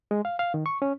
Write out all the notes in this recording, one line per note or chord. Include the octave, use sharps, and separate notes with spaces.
G#3
F5
F5
D#3
C#6
C#4